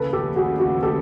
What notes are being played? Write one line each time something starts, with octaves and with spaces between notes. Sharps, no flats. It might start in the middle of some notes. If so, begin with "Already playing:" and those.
Already playing: D#2 C#3 F3 A3 A4 B4
G4 A4
F#4 G#4
F#4 G#4
G4 A4